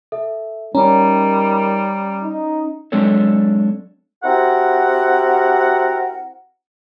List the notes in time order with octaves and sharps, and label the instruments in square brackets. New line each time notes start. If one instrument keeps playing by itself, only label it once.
[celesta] A4 E5
[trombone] D#3 [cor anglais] G3 [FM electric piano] C#4 [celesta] A#5
[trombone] D#4
[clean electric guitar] F#3 G#3 C4 D4 A4 C#5
[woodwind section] C4 E4 F#4 G4 A#4 F#5